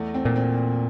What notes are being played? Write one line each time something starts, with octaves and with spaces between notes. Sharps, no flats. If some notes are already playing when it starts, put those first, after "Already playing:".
Already playing: E2 A3
C4
A#2
C4